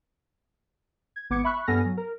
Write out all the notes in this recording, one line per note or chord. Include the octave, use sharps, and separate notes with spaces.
G#6
G#1 B3 D6 G#6 C#7
E5 B5 C#6 F#6
G2 B3 A4 G#5 F6 A#6
F#3
A#4